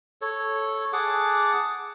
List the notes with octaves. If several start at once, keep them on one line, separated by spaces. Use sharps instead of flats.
A4 C#5
G#4 F#5 A5 D6